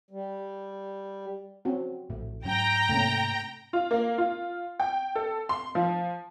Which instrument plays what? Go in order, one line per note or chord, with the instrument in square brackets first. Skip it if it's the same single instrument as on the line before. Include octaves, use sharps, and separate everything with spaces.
[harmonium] G3
[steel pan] C4 C#4 F#4
[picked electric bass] A#1 A2 [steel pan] A3
[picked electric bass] G#2 F#3 C#4 [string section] G5 A#5
[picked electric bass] G#2 C3 A#3 [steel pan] A3 C4 C#4
[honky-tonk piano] F4
A#3
F4
G5
A4
C6
F3